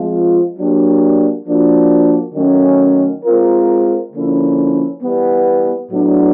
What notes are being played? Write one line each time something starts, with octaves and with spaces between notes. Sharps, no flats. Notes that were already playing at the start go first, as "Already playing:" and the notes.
Already playing: F3 G#3 C4 F4
F#3 A#3 D4 G4
F3 A#3 D4 F#4
D#3 F#3 A3 C#4
G#3 C4 F4 A#4
D3 F3 A#3 C#4 E4
E3 G3 B3
A2 F#3 B3 D4